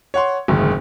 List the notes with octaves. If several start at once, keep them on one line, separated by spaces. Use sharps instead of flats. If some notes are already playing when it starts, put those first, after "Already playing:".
C#5 F#5 C6
F#1 D2 G#2 D#3